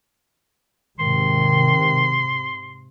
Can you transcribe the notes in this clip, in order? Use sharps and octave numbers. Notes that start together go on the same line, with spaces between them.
G#2 C3 D#3 C6